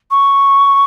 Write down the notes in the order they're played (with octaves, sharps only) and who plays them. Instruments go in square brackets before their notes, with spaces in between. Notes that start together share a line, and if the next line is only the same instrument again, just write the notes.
[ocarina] C#6